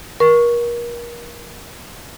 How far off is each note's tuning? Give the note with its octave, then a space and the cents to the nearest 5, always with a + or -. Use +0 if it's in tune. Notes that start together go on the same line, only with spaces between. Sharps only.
A#4 +35 C#6 +0